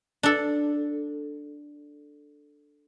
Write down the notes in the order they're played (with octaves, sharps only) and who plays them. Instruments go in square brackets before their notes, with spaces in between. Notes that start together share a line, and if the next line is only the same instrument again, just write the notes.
[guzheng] D4 A4